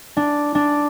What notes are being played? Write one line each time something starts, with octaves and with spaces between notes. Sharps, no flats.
D4
D4